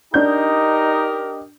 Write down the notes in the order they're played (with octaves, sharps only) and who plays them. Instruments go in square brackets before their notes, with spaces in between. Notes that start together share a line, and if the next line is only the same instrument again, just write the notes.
[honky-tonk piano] D4 G6 [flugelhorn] D#4 [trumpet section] G4 A#4 D#5